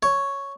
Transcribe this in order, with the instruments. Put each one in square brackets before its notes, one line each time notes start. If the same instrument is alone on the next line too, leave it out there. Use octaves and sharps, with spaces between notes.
[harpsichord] C#5